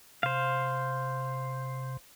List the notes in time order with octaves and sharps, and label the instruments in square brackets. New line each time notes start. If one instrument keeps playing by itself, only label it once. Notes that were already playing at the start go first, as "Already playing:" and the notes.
[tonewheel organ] C3 [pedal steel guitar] C5 F5